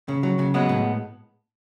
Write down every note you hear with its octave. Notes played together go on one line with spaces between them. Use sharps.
C#3
F#3
C#3
F#3 G#3 B3
A2